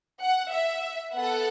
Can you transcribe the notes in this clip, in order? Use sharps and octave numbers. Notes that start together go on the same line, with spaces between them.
F#5
E5
B3 A4 F#5